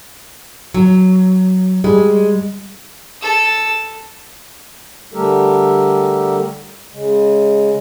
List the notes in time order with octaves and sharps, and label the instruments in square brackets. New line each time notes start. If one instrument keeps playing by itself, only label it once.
[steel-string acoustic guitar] F#3
[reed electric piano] G3 [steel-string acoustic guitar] G#3
[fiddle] A4 E6
[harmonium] D3 G3 A3 G4 A4 A#4
C#3 G#3